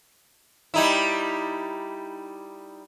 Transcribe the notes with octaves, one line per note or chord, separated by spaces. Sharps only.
G3 D#4 E4